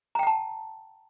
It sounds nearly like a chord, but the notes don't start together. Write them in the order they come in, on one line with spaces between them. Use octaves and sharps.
A#5 G5 F#5 A5